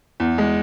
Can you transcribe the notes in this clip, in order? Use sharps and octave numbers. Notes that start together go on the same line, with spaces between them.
E2
G#3